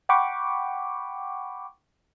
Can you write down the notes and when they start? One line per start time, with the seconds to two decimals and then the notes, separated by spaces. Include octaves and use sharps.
0.09 F#5 G5 B5 C#6 D6